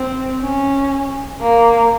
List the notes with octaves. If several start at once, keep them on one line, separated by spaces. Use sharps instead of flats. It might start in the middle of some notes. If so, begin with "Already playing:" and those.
Already playing: C4
C#4
A#3